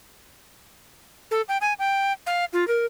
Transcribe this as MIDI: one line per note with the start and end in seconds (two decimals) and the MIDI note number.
1.31 1.42 69
1.48 1.57 79
1.61 1.73 80
1.79 2.13 79
2.26 2.45 77
2.53 2.67 65
2.67 2.86 70